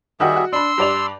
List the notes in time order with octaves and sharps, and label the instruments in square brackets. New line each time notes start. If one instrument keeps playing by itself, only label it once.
[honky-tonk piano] D#3 D#4 F#4 [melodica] G3 G#4 E5
[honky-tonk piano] F#4
[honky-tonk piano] D4 B5 [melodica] C6 E6
[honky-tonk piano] G2 D5 F7